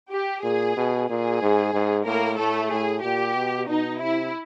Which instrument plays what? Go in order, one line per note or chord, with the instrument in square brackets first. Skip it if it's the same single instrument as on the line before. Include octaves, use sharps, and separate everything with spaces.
[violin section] G4
[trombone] A#2 [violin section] G#4
[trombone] B2
[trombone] A#2 [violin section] G#4
[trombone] G#2
G#2
[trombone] A2 [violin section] A#3 A#4
[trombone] A2 [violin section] A3 A4
[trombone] A2 [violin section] G#4
[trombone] A#2 [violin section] G4
[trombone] B2
[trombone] B2 [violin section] D#4
[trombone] C3 [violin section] E4